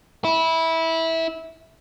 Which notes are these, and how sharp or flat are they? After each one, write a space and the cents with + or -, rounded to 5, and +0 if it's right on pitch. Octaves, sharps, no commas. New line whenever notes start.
E4 -15